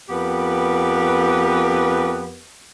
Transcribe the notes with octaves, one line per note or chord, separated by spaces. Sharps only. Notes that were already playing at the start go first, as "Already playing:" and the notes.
F2 B3 G4 A#4 B4